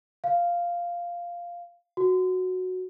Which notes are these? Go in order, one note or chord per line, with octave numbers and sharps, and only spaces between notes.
F5
F#4